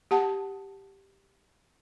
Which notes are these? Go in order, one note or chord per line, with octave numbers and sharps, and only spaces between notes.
G4 F#5 A5